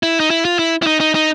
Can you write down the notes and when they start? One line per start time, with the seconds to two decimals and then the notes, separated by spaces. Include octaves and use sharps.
0.03 E4
0.20 D#4
0.30 E4
0.45 F4
0.59 E4
0.82 E4
0.87 D#4
1.00 D#4
1.15 D#4